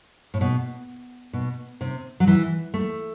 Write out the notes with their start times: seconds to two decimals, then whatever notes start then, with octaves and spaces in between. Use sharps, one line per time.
0.34 A2
0.41 B2
1.33 B2
1.81 C3
2.20 F#3
2.27 E3
2.74 A3